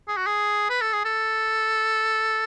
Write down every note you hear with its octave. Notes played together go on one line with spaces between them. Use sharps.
G#4
F#4
G#4
B4
A4
G#4
A4